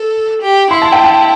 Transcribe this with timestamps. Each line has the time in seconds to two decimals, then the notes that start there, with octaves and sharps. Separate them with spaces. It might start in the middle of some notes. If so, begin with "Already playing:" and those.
Already playing: A4
0.42 G4
0.71 E4 C6
0.82 A5
0.92 G5
1.04 A5